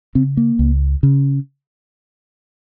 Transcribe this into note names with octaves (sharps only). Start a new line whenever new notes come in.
C#3 C4
A#3
C#2
C#3